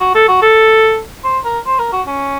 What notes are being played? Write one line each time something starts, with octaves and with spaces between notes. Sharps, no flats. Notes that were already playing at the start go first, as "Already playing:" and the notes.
F#4
A4
F#4
A4
C5
A#4
C5
A#4
F#4
C#4